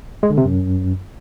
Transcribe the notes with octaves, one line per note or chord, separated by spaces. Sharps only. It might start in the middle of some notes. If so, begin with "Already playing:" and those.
G#3
D3
C3
F#2